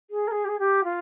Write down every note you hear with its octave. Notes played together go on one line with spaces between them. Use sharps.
G#4
A#4
G#4
G4
G#4
G4
F4